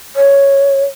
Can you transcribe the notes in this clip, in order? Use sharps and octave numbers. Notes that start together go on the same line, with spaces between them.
C#5